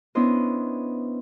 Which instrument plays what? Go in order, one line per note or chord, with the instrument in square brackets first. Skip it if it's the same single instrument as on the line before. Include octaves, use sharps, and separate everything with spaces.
[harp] B3 C#4 D4 E4 C5 D#5